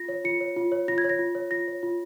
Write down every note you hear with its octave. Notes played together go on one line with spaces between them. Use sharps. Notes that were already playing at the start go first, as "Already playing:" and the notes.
Already playing: F4 A#6
C#5
F4 C#7
C#5
F4
C#5
F4 A#6
G#6
C#5
A#6
F4
C#5
F4 A#6
C#5
F4